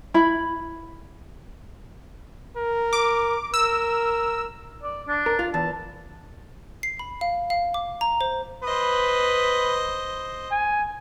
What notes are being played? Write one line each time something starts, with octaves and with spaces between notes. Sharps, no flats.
E4 B5
A#4
D6
A#4 E6
D5
D4
A#4
F4
E2 A5
C7
B5
F5
F5
D6
A#5
C5
B4 C5 D#5
G#5